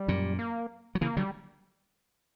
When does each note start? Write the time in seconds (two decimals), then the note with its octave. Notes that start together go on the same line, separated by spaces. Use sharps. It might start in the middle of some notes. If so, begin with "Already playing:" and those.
Already playing: G3
0.08 F#2 A#2
0.39 A#3
0.95 F#3
1.01 C#3 E3 A#3
1.17 D3 F#3 G3